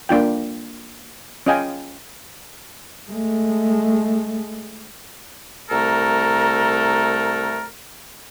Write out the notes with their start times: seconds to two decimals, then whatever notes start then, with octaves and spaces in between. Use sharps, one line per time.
0.09 A#3 D4 F4 G5
1.46 C#4 F4 D#5 F5 G5 G#5
3.11 G#3 A3
5.70 C2 A3 A4 A#4 A#5